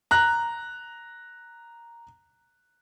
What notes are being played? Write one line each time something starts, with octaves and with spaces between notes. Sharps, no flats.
A#5 F#6